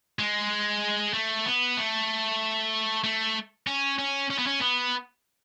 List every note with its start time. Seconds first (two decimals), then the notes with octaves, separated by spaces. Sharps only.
0.19 G#3
1.14 A3
1.46 B3
1.77 A3
3.04 A3
3.67 C#4
3.98 C#4
4.30 C#4
4.39 B3
4.47 C#4
4.61 B3